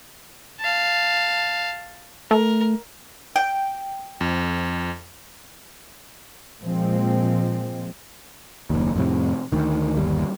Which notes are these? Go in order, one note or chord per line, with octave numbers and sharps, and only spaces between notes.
F5 A5
A3 A#4
G5
F2
A#2 F3 G#3 C4
F#1 D#2
F2 A2 C3
D2 D#3
G1 D#2 G3